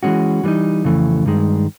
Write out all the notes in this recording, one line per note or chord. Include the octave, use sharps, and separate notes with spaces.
E3 G#3 C#4 F#4
E3 G3 B3 D#4
F2 C#3 E3 A3
G2 D#3 G#3